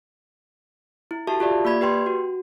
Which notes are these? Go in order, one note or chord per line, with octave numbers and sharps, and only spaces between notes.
E4
F#4 G4 A4 E5 A5
F4 G4 D5 E5
A#3 D5 B5 G#6
G4 B4 G5 C6
F#4